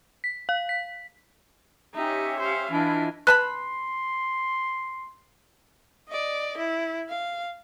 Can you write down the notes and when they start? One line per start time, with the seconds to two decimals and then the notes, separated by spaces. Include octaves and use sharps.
0.24 B6
0.49 F5
0.69 B6
1.95 C#4 D#4 G4 E5
2.40 C5 F5
2.71 E3 D4 E4 F4 D#5
3.27 B4 A5 B5 C6 F#6
6.09 D5 D#5
6.57 E4
7.09 F5